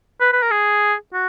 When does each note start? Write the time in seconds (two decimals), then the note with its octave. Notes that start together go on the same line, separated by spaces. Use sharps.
0.20 B4
0.33 B4
0.42 A#4
0.51 G#4
1.13 F#4